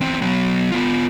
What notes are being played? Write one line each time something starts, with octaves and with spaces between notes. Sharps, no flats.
E2 C4
F#3 B3
B3 F4